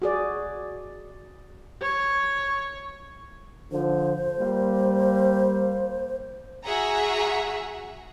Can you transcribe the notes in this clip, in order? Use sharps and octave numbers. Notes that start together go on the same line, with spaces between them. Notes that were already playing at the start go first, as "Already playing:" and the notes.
F#4 G#4 D5
C#5
D3 F3 C5
G3 A#3
F#4 G#4 E5 F#5 A#5